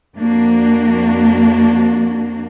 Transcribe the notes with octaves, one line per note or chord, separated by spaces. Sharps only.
F2 A#3 D4 F#4